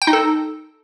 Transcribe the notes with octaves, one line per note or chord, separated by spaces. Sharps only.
G5
D#4
A4